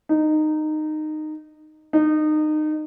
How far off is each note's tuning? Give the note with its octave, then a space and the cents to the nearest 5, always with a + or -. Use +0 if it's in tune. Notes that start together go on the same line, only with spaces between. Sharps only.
D#4 -15
D#4 -25